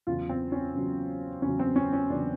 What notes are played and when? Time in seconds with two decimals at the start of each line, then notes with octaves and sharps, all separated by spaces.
0.07 E2 C#3 F#3 F4
0.29 C4
0.52 C#4
0.75 E2 C#3 F#3
1.42 E2 C#3 F#3 C#4
1.59 C4
1.76 C#4
1.93 C#4
2.10 E2 C#3 F#3 D4